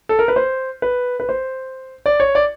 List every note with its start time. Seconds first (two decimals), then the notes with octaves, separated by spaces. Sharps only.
0.09 A4
0.19 A#4
0.28 B4
0.36 C5
0.82 B4
1.20 B4
1.29 C5
2.06 D5
2.20 C#5
2.35 D5